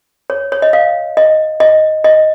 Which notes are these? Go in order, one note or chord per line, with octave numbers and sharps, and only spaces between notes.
C#5
C#5
D#5
F5
D#5
D#5
D#5